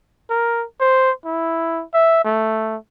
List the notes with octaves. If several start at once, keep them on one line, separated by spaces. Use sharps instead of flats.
A#4
C5
E4
E5
A3